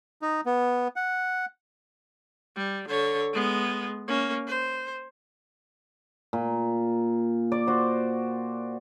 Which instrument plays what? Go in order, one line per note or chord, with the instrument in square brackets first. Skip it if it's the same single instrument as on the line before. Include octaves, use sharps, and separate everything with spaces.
[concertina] D#4
B3
F#5
[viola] G3
D3 C#5
G#3 B3
A#3 C#4
C5
[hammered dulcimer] A#2
D5
F#4 C5